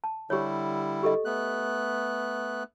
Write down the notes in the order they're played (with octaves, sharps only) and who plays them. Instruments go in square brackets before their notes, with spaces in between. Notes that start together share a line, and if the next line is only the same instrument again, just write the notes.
[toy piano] A5
[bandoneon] D3 G3 E4 [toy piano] G4 C#5
[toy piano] G4 A4 D#5
[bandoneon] A3 B3 F#6